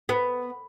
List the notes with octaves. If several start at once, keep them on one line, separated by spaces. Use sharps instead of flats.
B3